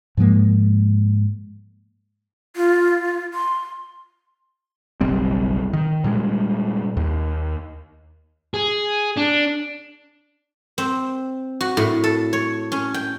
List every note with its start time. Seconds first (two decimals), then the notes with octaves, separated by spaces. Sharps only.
0.17 G#2 F3 G#3 A#3
2.56 F4
3.34 C6
5.01 F#1 B1 G3 C4
5.73 D#3
6.04 A#2 G3 G#3
6.97 D#2
8.54 G#4
9.17 D4
10.78 C4
11.61 F#4
11.77 A2
12.04 A4
12.33 C#5
12.72 C#4
12.94 G5